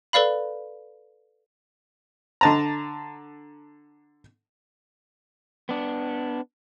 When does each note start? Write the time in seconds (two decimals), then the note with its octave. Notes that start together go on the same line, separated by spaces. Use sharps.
0.13 A4 B4 D5 F5 B5
2.41 D3 A5 A#5
5.69 B3 D4